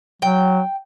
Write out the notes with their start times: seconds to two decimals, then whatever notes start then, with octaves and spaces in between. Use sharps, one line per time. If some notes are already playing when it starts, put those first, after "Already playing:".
0.22 F#3 G5